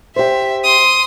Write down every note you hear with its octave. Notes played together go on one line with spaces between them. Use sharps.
G4 C5 E5
C6 D#6